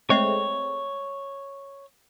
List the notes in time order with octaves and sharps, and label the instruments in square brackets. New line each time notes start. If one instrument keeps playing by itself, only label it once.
[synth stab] G#3 A3 C4 [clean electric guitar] C#5